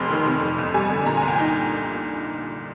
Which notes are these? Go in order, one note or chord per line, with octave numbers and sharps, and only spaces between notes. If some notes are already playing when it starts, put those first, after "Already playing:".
Already playing: F1 F2 C6
D#3
C3
F2
G1
G3 G#5
D3
A#2 A#5
G#5
C2
G5
D#4 G#5